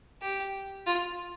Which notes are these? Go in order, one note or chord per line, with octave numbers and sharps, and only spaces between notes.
G4
F4